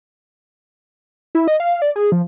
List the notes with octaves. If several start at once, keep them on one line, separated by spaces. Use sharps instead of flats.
E4
D#5
F5
D5
G#4
F3